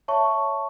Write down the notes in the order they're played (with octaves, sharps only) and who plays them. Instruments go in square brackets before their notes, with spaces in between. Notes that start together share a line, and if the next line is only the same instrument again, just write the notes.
[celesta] C#5 E5 A5 C#6